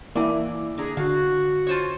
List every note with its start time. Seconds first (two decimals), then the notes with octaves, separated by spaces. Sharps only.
0.16 E3 A#3 E4 D5
0.78 D3 G#4 A#5
0.97 D3 F#4 F5
1.67 F4 C5 C#5